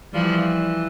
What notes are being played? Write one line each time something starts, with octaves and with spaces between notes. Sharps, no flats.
E3 F3 G3